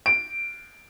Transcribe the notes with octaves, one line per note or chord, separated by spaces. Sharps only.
D7